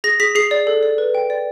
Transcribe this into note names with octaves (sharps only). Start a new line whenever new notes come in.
G#4 A#6
G#4 B6
G#4 C7
D5
A4
D5
B4
G5
D5